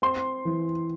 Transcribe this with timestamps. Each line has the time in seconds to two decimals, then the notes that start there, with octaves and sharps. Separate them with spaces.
0.02 C4 C6
0.45 E3